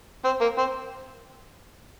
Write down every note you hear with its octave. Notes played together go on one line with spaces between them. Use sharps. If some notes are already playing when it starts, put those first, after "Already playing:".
C4
A#3
C4